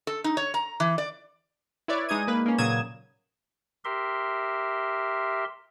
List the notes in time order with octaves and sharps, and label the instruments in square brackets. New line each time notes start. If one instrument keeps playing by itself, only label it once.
[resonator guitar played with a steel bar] A4
D#4
C#5
A#5
E3
D5
[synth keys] E4 B4 C#5 D5
G#3 D#4 D#6 G#6 D#7
A#3 B4
A#3 C#4
A#2 C#3 F#3 D#6 G#6 E7
[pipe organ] G4 A#4 E5 C6